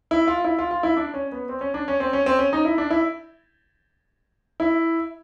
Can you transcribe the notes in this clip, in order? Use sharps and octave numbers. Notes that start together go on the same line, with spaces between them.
E4
F4
E4
F4
F4
E4
D4
C#4
B3
C4
C#4
D4
C#4
C4
C#4
C4
C#4
D#4
E4
D4
E4
E4